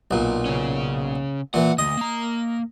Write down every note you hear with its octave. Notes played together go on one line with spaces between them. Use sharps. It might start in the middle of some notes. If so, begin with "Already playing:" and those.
B1 A#2
C#3 C#4
A#2 E3 F#5
D2 D#5
A#3 A#5